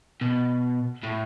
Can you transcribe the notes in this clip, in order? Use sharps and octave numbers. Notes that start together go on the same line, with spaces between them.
B2
A2